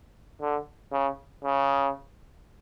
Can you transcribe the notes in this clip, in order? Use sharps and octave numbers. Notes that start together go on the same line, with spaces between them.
D3
C#3
C#3